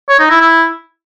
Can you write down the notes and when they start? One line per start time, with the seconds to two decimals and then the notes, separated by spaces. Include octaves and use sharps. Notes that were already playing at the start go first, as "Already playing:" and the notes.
0.09 C#5
0.19 D#4
0.30 E4
0.41 E4